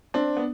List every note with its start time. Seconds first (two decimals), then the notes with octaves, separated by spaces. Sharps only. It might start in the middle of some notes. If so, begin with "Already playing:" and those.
0.14 C4 D4
0.37 B3